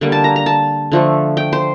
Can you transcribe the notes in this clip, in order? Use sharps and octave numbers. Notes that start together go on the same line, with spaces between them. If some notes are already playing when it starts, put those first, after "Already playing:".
D3 G3 A#3
A5
A#5
A#5
A5
D3 F3 A3
G5
C5